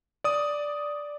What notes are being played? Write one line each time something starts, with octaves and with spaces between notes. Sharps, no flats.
D5 D#6